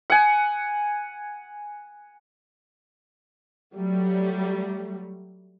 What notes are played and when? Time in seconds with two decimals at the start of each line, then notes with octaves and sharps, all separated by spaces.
0.10 F#5 G#5
3.75 F#3 G3 A3